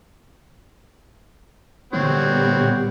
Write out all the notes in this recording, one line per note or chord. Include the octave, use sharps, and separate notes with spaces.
A#2 D3 G3 B3 C4 F#4 C#5